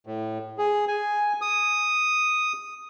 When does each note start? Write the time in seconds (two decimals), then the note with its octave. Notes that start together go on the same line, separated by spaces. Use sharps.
0.07 A2
0.58 G#4
0.88 G#5
1.41 D#6